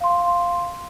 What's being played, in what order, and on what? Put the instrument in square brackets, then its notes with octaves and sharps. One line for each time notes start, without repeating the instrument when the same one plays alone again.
[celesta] F5 C6